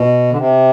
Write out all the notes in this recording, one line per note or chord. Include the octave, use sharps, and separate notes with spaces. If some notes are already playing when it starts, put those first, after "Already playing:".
Already playing: B2
D3
C3